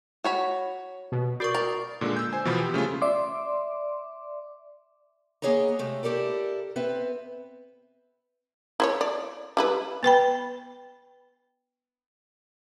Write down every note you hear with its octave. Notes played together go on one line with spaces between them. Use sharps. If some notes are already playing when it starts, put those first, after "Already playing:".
F#4 C#5 B5
B2
F#4 A#4 D5 C#6
A#4 A6
A#2 D3 G#3
E6 G6
C5 G#5
B2 E3 F3 F4 B5
G4
C#3 A3 C#4 F4
D5 E5 C6 D6
A#3 B3 G#4 C#5 D#5 A#5
C3 G#3 A3
E4 G4 A4 A#4 D5
B3 C4 B4 E5
E4 C5 C#5
D5
G3 E4 B4
B3 B4 G5 B5